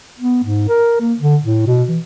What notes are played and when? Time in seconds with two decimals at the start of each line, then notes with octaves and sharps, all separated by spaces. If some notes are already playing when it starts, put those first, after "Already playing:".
0.20 B3
0.43 G#2
0.68 A#4
1.01 A#3
1.19 D3
1.43 A2
1.67 B2
1.89 E3